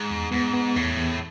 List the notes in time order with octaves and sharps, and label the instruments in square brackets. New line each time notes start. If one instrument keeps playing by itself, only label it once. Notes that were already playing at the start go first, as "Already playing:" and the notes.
Already playing: [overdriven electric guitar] G#2
[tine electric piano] E2
[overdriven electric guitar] G#2 [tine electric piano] B3
[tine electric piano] B3
[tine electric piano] E2 [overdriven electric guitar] A2
[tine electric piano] E2